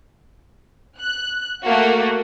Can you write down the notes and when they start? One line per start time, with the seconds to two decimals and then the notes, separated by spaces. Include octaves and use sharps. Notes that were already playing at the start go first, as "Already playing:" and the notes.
0.98 F#6
1.63 A3 A#3 F#4